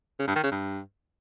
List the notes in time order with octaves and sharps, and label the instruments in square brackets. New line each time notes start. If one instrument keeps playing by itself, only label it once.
[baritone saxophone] C#3
G2
D#3
C#3
G2